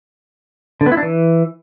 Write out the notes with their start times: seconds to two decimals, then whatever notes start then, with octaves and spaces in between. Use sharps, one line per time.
0.81 D3
0.86 B3
0.92 E4
0.97 D4
1.03 E3